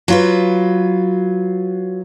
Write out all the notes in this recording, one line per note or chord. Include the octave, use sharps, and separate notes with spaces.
F#3 F4 B4